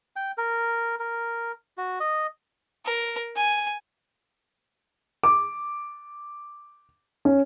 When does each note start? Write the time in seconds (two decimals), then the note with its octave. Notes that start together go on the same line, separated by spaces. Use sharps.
0.16 G5
0.38 A#4
0.99 A#4
1.77 F#4
2.00 D#5
2.85 A#4
3.36 G#5
5.23 D6
7.25 C#4